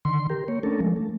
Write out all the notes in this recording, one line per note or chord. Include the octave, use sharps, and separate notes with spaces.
D3 D#3 C6
G4 A#4
A#3 C#5
A3 C#4 D4 A4 A#4
F3 G#3
A3